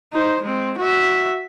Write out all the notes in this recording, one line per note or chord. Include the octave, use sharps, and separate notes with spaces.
D#4 C5
G#3 C4
F#4 E5